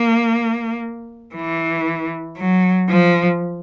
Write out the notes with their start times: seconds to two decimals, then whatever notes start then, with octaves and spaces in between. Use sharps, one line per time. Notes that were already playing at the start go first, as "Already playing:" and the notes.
Already playing: A#3
1.36 E3
2.37 F#3
2.90 F3